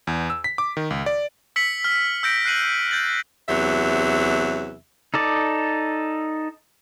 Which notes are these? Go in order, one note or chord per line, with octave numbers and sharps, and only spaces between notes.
E2
E6
B6
D6
D#3
C#2
D5
E6 B6 C#7 F#7
F6
E6 G6 A#6 D7
F#6 C7 D#7 F#7
G6 A6 F#7
E2 C3 F#3 E5
D#4 A4 D5